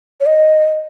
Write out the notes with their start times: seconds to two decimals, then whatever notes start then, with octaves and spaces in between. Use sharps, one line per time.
0.21 C#5
0.26 D#5